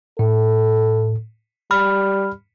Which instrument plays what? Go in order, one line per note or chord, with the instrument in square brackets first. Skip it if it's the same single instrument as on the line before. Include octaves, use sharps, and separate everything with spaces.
[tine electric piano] A2 [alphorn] A4
[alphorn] G3 [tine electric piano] B5 F6